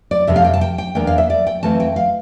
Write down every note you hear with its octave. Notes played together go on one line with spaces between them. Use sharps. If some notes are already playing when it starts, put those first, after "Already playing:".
D5
F2 C3 G3 E5
F5
G5
A5
G5
G5
E2 E3 A#3 D4 G5
F5
E5
D5
G5
F2 E3 A3 C4 A5
G5
F5